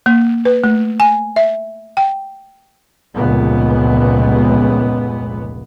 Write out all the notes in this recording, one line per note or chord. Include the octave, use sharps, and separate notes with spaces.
A#3
B4
A3
G#5
E5
G5
F1 C#2 A#2 B3